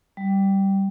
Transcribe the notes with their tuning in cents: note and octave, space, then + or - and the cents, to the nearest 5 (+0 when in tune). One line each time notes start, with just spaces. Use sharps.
G3 -10